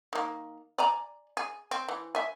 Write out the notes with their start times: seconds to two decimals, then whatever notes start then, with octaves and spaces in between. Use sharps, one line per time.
0.13 D#3 A#3
0.78 D5 G#5 A#5
1.37 G#4
1.71 C4
1.88 E3
2.15 E5 G#5